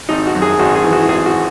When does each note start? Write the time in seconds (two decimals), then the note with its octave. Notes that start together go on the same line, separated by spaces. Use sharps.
0.09 G#1 D#4
0.26 F#4
0.35 F#2
0.42 G#4
0.59 G#1 F#4
0.75 G#4
0.84 E3
0.92 F#4
1.08 G#1 G#4
1.26 F#4